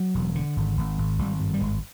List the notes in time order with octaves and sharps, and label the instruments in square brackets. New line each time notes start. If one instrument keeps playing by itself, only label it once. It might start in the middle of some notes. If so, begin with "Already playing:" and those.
Already playing: [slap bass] F#3
E1
D3
G#1
G#1
G#1
G#1 G3
G2
G3
G#1 G#3